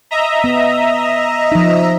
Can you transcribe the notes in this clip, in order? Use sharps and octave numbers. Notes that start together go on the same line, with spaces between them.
D#5 E5 A#5
B3
F3 D#4